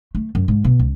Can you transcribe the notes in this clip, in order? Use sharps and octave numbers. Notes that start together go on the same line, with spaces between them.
A3
F#2
G#2
B2
C#2